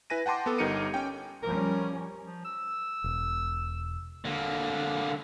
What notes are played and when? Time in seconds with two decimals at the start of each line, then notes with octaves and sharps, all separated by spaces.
0.10 E4 B4 G#5 A#6 D#7
0.26 F#5 G5 A5 C6 D6
0.46 B3 A4
0.58 G1 G3 D#4 A#4 C#7 D#7
0.94 C#4 G5
1.43 F3 G3 C#4 A#4
2.25 F3
2.45 E6
3.04 E1
4.25 D3 A#3